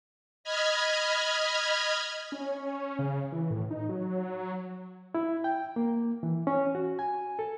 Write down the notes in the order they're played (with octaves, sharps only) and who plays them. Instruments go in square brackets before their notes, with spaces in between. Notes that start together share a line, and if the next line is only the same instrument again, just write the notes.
[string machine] D#5 B5 F6 G#6
[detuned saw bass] C#4
C#3
E3
A2
D#4
F#3
[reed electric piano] E4
G5
A#3
E3
C#4
F#4
G#5
A4